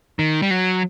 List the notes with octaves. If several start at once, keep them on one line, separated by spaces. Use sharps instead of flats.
D#3
G3
F#3